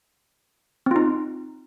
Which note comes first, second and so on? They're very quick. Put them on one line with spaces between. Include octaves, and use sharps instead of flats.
C4 F4 D#4